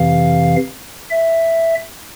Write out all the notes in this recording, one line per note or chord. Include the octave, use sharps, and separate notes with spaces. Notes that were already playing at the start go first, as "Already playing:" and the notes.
Already playing: F2 C3 E3 F5
E5